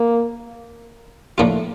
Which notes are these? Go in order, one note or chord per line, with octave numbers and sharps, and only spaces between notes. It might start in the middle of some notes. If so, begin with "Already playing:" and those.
Already playing: A#3
A2 F3 A3 A#3 D4 F4